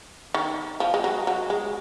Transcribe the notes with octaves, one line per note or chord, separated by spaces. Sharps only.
D#3
F3
G#3
F#3
F#3
G#3